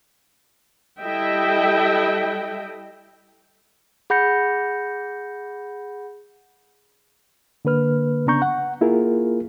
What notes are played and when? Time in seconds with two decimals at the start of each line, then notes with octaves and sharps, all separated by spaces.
1.01 G3 E4 A4 D#5 E5 G5
4.10 G#4 F#5 B5 G6 A#6 C#7
7.65 D3 A#3 B4 F6
8.27 C#3 B3 D4 A#5 C#6 G6
8.42 F#5
8.81 A#3 E4 F4 G#4 A#4